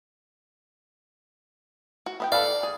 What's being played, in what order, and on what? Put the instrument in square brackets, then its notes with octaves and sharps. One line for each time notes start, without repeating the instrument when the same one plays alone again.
[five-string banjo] F#4
B3 D#5 G5
[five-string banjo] A4 B4 F5 [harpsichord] D5
[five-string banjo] G#4